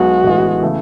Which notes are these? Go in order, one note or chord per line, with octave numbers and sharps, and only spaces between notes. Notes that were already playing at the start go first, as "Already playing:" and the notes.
Already playing: B1 G#3 B3 F#4
A1 A2 G#3 B3
C#3 E3 A3